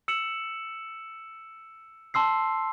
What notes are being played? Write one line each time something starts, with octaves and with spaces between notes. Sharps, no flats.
E6 C#7 E7 F#7
A5 C6 E6 C7